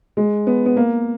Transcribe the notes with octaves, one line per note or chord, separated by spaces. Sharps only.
G#3
B3
B3
A#3